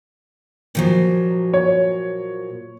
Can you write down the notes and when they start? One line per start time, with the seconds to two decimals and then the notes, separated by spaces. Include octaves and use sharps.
0.75 A#2 F3 F#3
1.53 C#5